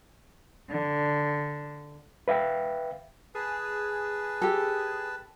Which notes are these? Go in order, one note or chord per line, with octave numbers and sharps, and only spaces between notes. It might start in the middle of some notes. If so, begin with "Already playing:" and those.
D3
B4 E5 F5 G5
G#4 B4 A5
G4 A4